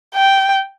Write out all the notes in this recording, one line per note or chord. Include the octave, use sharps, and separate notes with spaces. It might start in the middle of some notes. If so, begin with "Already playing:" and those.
G5